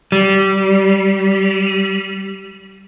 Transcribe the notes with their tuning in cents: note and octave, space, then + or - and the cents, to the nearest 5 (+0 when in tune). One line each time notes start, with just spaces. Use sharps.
G3 -20